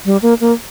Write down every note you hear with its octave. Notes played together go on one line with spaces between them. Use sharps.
G3
A#3
A#3